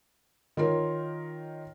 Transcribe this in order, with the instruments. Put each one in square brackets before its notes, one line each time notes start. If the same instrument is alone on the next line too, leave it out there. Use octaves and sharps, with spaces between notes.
[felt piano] D#3 F4 A#4 C#5